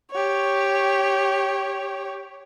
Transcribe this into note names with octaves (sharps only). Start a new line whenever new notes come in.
G4 C#5